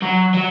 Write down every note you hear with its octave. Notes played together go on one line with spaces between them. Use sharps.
F#3
F#3